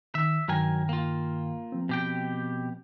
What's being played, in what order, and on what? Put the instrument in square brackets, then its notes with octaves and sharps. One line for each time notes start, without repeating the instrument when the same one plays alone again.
[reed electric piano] D#3 [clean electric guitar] E5
[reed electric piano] G2 D#3 G5 [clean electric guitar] F#3 A#4 G#5
[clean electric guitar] A#3 F4
[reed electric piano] F3 C4
[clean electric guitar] B2 G4 G5